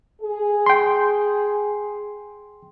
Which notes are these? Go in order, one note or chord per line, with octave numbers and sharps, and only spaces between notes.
G#4
G5 C6